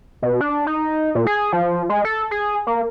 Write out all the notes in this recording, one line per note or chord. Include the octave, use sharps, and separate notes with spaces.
B2
D4
D#4
A#2
G#4
F3
G#3
A4
G#4
A#3